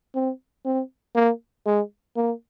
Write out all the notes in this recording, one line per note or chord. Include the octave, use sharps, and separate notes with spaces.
C4
C4
A#3
G#3
A#3